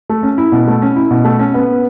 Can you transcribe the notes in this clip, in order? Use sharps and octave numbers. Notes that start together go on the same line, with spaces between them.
A3
C#4
E4
B2
A3
C#4
E4
B2
A3
C#4
B3